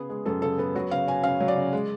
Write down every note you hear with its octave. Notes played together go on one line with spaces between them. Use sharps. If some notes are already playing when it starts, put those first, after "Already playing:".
Already playing: C#3 B3 G#4
G#3
F#2 A4
C#3 A4
B3 A4
F#3 F#4
C#3 F5
C#4 G#5
C#3 F5
F#3
D5
C#3
G#3